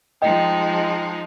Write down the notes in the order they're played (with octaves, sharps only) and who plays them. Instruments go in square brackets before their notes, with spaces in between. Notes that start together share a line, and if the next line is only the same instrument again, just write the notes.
[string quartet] F3 G#3 D#4 [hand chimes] D#5 G5